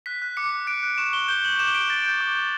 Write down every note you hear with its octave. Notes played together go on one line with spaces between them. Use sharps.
F#6 B6
F#6
D6 C#7
D6
F#6 D7
F#6
C#6 E7
C#6 G7
G6 G7
G6 F#7
D6 E7
D6 D7
G6 A6
G6
D6
D6